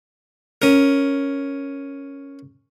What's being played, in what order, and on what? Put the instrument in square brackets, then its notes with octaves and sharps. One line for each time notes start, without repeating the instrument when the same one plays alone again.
[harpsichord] C#4 A#4